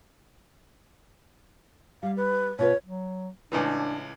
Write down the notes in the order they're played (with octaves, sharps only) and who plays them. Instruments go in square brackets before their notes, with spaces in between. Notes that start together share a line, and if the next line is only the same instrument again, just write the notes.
[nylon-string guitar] G3 [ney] F5
[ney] B4
[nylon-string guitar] B2 F4 B4 [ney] C#5
[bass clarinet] F#3
[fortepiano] C#2 A2 E3 [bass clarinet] D4